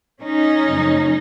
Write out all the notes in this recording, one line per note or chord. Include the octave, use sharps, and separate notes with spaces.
C#4 D#4
F#2 C#3 F3 A3